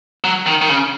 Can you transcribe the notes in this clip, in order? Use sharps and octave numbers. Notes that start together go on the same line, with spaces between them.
F#3
D#3
D#3
C#3